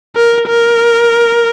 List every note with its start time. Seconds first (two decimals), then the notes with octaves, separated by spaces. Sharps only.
0.16 A#4
0.48 A#4